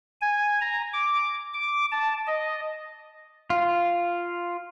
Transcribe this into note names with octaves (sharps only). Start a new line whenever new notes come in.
G#5
A#5
D6
D6
A5
D#5
F4